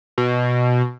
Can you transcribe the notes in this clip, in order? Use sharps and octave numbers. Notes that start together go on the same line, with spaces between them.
B2